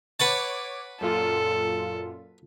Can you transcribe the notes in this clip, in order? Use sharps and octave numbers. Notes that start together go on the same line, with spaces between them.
B4 C#5 F#5 A5 D6
F#2 A#2 F4 A4